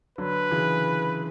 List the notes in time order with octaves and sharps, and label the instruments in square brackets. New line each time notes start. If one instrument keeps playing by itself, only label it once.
[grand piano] D3 F#3 [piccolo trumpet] B4
[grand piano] C#3 E3